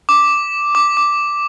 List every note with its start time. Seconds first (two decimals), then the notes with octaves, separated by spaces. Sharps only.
0.09 D6
0.75 D6
0.97 D6